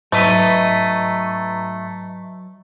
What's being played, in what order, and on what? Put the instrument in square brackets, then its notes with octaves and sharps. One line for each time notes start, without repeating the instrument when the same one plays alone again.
[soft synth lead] G#2 [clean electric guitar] F#3 B4 D#5 [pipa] A3